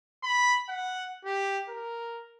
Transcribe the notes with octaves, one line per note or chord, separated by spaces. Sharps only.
B5
F#5
G4
A#4